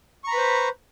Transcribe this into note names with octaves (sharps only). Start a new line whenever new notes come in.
B4 C5 A#5 B5 C#6